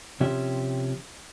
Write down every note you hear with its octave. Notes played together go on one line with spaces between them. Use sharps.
C3 F3 C#4 G4 E5